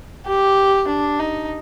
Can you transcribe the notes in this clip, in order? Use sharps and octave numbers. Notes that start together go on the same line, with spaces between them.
G4
D4
D#4